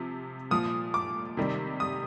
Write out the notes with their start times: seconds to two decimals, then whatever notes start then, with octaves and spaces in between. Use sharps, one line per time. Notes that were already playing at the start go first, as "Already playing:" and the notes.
Already playing: C3 F3
0.51 A#2 F3 D#6
0.94 D6
1.37 C3 D#3 G3
1.80 D#6